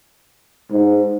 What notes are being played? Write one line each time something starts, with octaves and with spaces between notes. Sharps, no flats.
G#2